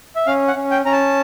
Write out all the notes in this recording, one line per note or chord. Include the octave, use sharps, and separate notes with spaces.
E5
C#4 F5
F#5
C#4
G5
C#4 A#5
A5